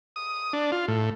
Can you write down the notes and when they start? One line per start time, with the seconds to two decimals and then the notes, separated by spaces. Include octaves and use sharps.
0.16 D#6
0.53 D4
0.72 F4
0.88 A2